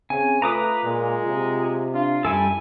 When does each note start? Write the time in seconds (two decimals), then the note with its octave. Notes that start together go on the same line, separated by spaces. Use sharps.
0.10 C#3 C4 G#5
0.42 A3 F4 B4 A#5 D6 D#6
0.84 A#2 G#3
1.28 C3
1.94 D4 F4
2.25 F#2 G3 E4 A4 G#5